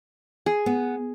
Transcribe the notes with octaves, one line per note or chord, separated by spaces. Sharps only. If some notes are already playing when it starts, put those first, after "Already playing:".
G#4
B3